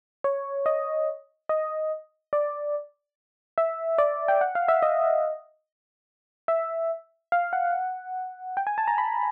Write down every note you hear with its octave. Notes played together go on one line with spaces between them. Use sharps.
C#5
D#5
D#5
D5
E5
D5
G5
F#5
F5
E5
D#5
E5
F5
F#5
G5
G#5
A5
A#5
B5